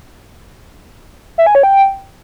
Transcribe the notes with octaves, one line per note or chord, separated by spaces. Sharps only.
E5
G#5
C#5
G5